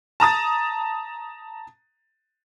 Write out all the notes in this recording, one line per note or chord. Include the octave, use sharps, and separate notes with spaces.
A5 A#5 D#6 A6